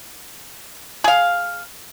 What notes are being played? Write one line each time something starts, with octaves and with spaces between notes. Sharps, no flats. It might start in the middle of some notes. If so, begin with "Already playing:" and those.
G#4 F5